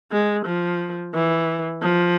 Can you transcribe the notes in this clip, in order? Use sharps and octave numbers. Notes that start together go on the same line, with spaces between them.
G#3
F3
E3
F3